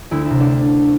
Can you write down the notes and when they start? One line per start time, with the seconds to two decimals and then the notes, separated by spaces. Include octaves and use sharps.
0.11 D2 E4
0.26 C3 E4
0.40 D4